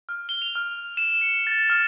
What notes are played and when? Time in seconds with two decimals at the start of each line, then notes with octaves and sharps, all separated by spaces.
0.09 F6
0.29 G7
0.42 F7
0.55 F6
0.97 E7
1.21 C#7
1.47 A6
1.70 F6